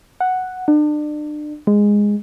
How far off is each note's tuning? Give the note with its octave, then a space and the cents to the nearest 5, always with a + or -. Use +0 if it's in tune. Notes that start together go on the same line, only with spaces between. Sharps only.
F#5 +0
D4 +35
G#3 -10